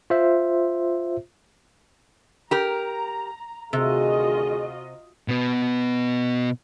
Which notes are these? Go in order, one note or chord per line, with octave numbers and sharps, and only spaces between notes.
F4 C5 E5
G4 A#4 A#5
D2 C3 D#3 F4 F#4 G#4 D#5
B2 B3